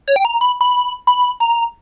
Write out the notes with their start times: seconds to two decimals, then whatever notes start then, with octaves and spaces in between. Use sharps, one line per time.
0.08 C#5
0.16 G5
0.25 A#5
0.41 B5
0.61 B5
1.07 B5
1.40 A#5